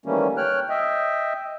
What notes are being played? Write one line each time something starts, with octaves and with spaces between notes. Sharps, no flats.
D#3 E3 G3 A3 A#3 C#4
C#5 G5 F6 F#6
D#5 E5 G5